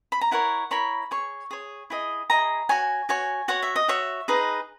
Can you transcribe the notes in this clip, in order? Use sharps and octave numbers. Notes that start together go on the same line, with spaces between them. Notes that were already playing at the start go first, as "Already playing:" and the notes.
B5
A#5
E4 A#4 C#5 F#5
E4 A#4 C#5 B5
G#4 C#5 C#6
G#4 C#5
E4 G#4 D#5
E4 G#4 D#5 A#5
F#4 C#5 G#5
F#4 C#5 G#5
F#4 C#5 F#5
E5
D#5
F#4 C#5 E5
D#4 G#4 B4 D#5